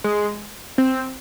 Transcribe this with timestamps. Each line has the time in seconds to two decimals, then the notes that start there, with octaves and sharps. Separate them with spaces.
0.04 G#3
0.78 C4